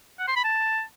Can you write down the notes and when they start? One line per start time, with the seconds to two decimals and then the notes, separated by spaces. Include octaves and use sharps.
0.19 F#5
0.28 C6
0.36 B5
0.44 A5